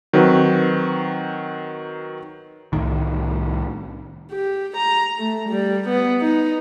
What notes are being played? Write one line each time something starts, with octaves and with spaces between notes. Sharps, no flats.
D#3 F#3 C4 F#4 B4
C2 A2 D#3
G4
A#5
A3
G3
B3
D#4